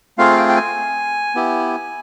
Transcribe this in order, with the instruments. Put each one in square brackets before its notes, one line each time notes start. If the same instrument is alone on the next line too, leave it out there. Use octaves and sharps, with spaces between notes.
[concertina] A3 C4 F4 G#4 F5
G5
G5
G#5
B3 E4 G4